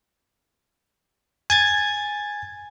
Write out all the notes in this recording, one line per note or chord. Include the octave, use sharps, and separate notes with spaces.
G#5 G#6 A6